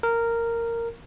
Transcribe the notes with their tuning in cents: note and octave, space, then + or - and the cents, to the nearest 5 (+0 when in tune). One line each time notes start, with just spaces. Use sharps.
A#4 -10